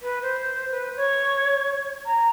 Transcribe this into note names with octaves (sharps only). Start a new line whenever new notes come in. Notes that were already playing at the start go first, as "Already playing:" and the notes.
B4
C5
B4
C#5
A#5